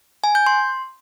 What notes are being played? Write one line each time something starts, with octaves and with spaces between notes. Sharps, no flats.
G#5
G6
C6